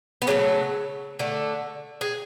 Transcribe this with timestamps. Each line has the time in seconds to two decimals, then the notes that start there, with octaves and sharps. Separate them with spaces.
0.22 B3
0.27 C#3 F#3 A3 C#4
1.19 D3 A3
2.01 G#4